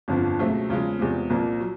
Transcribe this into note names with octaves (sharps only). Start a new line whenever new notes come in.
G1 F2 D3 F3
C#2 B2 F#3 A3 C4
E2 C#3 F3 G#3
E2 C3 F3 G#3
C2 A#2 F3 A#3
F#3